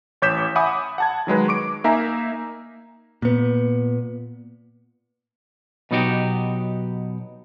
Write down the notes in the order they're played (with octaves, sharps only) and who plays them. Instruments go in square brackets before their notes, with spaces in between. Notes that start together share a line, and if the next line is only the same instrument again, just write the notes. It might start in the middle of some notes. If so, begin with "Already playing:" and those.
[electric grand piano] A1 C#5 D6 G6 B6 E7
E5 F#5 G#5 B5 D6 D#6
F#5 A5 G#6
D#3 F#3 G#3 B4
C#6 D6 D7
A#3 D#4 E5 G#5 A#5
[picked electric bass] A#2 B3
[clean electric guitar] B2 F#3 B3 D#4 F#4 G4